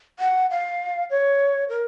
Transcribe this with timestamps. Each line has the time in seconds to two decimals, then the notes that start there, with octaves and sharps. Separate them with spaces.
0.19 F#5
0.51 F5
1.11 C#5
1.69 A#4